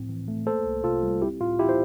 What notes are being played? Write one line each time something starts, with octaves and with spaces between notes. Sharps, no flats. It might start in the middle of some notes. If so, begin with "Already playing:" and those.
Already playing: A2 F3 C4
E3
A3
A#3 A4 C5
C2
C3 F4 A4
G3
C4 E4 G4
A2 F4
E3 E4 G4
C5